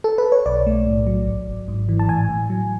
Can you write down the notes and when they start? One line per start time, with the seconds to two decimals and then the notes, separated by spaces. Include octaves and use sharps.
0.04 A4
0.18 B4
0.32 C#5
0.46 B1 D5
0.66 A3
0.87 A2
1.07 F#3
1.27 G#1
1.47 G#1
1.68 G#2
1.89 E3
1.99 A5
2.09 A2 G#5
2.29 A2
2.50 F#3